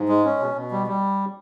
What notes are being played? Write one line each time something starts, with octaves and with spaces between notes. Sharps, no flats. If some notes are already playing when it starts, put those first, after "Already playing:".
Already playing: G#2
G#3
C#4
B2
B2
G3
G3